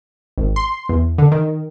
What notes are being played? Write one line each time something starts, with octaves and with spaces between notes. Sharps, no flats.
G#1
C6
E2
D3
D#3